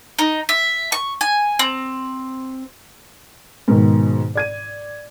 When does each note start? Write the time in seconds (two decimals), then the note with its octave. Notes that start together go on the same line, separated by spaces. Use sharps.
0.19 D#4
0.49 E5
0.92 C#6
1.21 G#5
1.59 C4
3.68 G#2 B2 D#3
4.35 D5 G#6 D#7